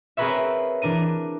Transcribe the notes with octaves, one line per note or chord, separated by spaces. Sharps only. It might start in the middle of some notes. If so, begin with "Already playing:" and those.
C4 G#4 A#4 B4 C#5 E5
E3 D4 A#4 D#7